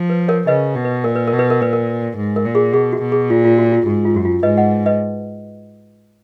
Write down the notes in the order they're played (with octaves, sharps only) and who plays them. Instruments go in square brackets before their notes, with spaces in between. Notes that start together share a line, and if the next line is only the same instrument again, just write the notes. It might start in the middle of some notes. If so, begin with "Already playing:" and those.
Already playing: [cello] F3
[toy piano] B4
A#4 C#5
[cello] C#3 [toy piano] B4 D#5
[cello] B2
[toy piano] B4
[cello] A#2 [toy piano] A#4
[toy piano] B4
A#4
[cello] B2
[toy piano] B4
A#4
[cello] A#2 [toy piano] B4
[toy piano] A#4
[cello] G#2
[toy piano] A#4
[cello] A#2
[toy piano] G#4
[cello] B2 [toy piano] G#4
[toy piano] F#4
[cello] B2
[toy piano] G#4
[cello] A#2 [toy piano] F4
[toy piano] F4
F#4
F4
[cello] G#2 [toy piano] F#4
[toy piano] F4
[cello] F#2 [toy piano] F#4
[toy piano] F4
[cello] G#2 [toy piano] B4 D#5
[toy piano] D#5 F#5
B4 D#5